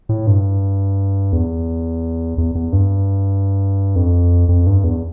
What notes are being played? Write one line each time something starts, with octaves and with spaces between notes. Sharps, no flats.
A2
G2
E2
E2
E2
G2
F2
F2
G2
E2